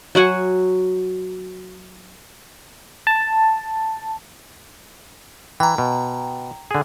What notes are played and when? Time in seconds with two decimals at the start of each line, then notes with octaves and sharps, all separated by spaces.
0.15 F#3 F#4 F#5 G#5
3.07 A5
5.60 E3 G5 A#5
5.78 B2
6.71 D3 G#4